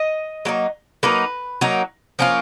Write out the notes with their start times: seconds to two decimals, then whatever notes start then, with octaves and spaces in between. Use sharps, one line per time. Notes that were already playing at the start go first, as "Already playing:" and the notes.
Already playing: D#5
0.45 F#3 A#3 D#4
1.03 F#3 A#3 D#4 B4
1.61 F#3 A#3 D#4
2.19 F3 A#3 C#4 F4